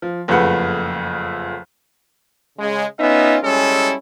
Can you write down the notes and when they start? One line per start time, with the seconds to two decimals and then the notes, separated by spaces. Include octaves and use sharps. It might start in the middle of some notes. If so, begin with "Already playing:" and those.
0.02 F3
0.28 F#1 F2 A3 G#4 B4 F#5
2.59 C#3 G#3
3.00 B3 C#4 D#4 F4 E5
3.44 G3 G#3 C#4 E4 A4